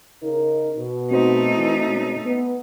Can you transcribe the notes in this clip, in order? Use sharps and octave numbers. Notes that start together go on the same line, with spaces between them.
C#3 D#4 A#4
B2
A3 C4 D#4 F#4 C5
E3
B2 G#3 C#4
B3